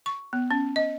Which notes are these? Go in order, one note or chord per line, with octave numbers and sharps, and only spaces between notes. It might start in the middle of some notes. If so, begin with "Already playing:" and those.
C#6
B3
C#4
D#5